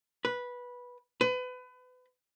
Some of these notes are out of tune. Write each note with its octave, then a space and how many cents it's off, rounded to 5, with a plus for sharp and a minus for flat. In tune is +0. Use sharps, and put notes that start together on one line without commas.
B4 -10
B4 +30